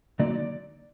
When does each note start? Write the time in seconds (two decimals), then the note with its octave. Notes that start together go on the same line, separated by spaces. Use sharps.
0.20 D3 F#3 A#3 D#4 D5